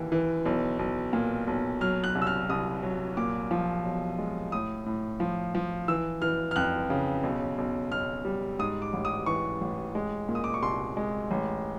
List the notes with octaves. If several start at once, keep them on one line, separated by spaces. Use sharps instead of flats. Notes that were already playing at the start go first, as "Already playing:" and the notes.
Already playing: D#2 E3
E3
B1
B1
A#2
B1
F#3 F6
F#6
C2
E6
F6
C2 D#6
F#3
A#2 D6
F3
B1
G#3
A2 D#6
A2
F3
F3
E3 E6
E3 F6
F6
F2 F#6
C#3
B1
B1
B1 F6
G3
G#2 D#6
D6
A1
D#6
E3 C#6
A1
G#3
A#2
D#6
D6
C#6
C2 C6
G#3
A1